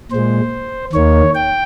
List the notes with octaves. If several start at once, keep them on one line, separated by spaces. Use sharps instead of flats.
A#2 G#3 C5
D#2 D#3 A#3 C#5
G5